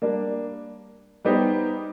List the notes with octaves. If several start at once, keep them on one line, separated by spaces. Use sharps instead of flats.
G3 A#3 D4
G3 B3 D#4 G4 C5